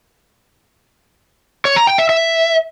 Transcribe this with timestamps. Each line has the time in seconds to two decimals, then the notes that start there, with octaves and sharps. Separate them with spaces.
1.65 C#5
1.76 A#5
1.87 G5
1.98 E5
2.09 E5